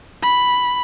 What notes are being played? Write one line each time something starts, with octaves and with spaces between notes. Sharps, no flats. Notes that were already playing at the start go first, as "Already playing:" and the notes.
B5